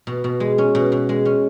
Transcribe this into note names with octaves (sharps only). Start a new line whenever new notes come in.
B2
B2
G#3
C#4
B2
B2
G#3
C#4